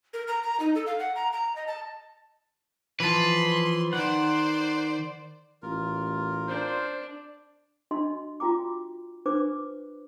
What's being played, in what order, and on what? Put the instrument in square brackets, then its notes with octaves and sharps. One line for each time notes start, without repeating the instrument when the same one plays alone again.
[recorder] A#4
A#5
A#5
D#4
A4
F5
F#5
A#5
A#5
D#5
A5
[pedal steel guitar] E3 F3 A5 [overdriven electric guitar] B4 [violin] C6
[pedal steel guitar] D#3 F#5 [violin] C5 D5
[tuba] A1 [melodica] F4 A#4
[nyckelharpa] D4 [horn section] C5
[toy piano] D4 F#4 D#5 C6
F4 F#4 G5 A#5 D6
D4 B4 C5 D6